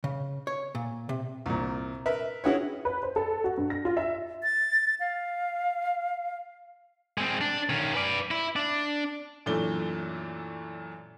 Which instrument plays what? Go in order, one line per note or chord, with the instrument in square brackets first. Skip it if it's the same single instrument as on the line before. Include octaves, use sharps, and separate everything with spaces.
[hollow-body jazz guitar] C#3
C#5
A#2
C3
[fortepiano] C2 A#2
A#4 B4 E5
C#4 E4 F#4 G#4 B4 C#5
[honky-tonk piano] B4
C5
A4
F#4
G2
A#6
F4
E5
[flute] A6
F5
[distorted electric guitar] G#3 C4
D4
D#3 C#4
B4 D5
E4
D4
[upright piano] F#2 A#2 E3 A3 D4 G7